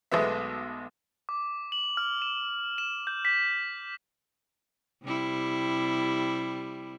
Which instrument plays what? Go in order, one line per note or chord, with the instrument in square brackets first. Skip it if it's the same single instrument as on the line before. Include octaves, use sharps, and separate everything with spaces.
[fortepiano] B1 G#3 A3 B3 E5
[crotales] D6
F#7
F6
E7
E7
G6
B6
[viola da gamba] C3 G3 E4